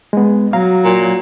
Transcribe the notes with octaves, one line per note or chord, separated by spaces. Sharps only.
G#3 B3
F#3 F5 A#5
A#2